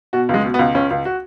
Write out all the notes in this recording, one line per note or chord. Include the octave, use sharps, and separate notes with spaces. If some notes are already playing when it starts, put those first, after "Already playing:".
B2 F#4
C#2 G#3
B2
B3
C#2
C#2 C#4
C#2
F#4